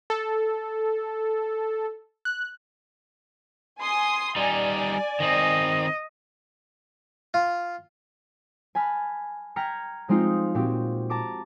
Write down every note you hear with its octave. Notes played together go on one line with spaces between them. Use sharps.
A4
F#6
G#5 C6 D#6
G3 D#4 D5 G#5
D#3 C4 D#5
F4
G#5 A5 B5 F6 F#6
G5 A#5 F6 G#6 B6 C#7
F3 G#3 C4 D#4 F4
A#2 C4 F#4 G4
A5 A#5 D6 D7